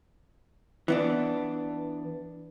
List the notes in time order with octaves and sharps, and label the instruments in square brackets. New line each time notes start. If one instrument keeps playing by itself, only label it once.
[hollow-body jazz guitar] E3 B3 D4